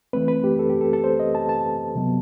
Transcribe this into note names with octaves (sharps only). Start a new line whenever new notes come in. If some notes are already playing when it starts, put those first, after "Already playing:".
E3 A3 C4 B4
B4
G4
A4
G4
A4
A4
C5
D#5
A5
A5
C3 F#3 B3